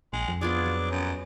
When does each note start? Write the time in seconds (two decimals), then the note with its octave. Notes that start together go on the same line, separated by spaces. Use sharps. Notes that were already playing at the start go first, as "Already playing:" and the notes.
0.13 A#1 G#3
0.28 F2
0.41 B3 D4 F4 G#4
0.65 F#3
0.91 F#2